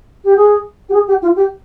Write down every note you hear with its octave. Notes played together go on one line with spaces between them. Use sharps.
G4
G#4
G4
G#4
G4
F4
G4